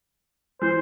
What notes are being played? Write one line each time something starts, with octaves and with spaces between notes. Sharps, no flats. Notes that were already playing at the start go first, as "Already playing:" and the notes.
E3 C5